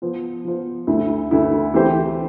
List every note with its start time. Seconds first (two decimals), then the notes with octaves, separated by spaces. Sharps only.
0.02 F3 B3 F4 C5
0.45 F3 B3 F4 C5
0.87 D2 D3 A3 E4
1.31 D2 D3 A3 E4
1.74 E3 A3 C4 G4 C5